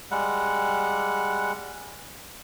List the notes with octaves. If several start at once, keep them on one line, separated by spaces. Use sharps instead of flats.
G3 G#3 F#5